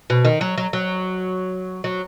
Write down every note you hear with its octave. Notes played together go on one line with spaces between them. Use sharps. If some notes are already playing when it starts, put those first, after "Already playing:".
B2
D#3
F#3
F#3
F#3
F#3